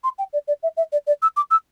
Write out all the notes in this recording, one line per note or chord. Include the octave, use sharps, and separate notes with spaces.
C6
G5
D5
D5
E5
E5
D5
D5
E6
D6
E6